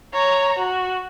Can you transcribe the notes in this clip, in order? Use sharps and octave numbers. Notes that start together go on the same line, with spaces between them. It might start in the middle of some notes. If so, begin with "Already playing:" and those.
C#5 A#5
F#4